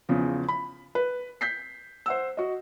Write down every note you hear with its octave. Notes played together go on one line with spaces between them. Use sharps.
E2 C#3 F3
B5
B4
G6 B6 C7
C5 F#5 E6
F#4 D#5